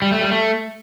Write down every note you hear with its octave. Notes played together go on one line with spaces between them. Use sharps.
G3
A3
G3
A3